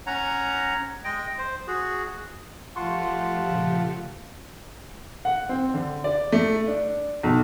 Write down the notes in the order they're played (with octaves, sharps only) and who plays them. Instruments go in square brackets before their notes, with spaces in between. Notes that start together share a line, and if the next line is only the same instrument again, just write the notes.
[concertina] C#4 C#5 F#5 A#5
G#3 D#5 G5
C5
F#4 G#4
[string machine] F3 A3 G4 [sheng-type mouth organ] F4 F#5 A5 [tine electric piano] C6 C#6
[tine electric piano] A#2 C#3
[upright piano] F#5
C4
D3
D5
A3
D4
B1